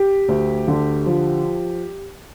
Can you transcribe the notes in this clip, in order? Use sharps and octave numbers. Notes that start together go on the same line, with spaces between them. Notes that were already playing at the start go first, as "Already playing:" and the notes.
Already playing: G4
D2
D3
F3